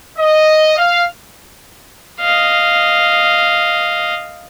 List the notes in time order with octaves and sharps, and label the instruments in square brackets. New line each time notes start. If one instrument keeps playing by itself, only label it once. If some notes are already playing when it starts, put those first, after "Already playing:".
[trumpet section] D#5
F5
[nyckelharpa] D#5 F5